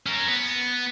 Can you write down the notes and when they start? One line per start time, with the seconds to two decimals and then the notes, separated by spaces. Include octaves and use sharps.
0.06 C#4 A#4
0.28 B3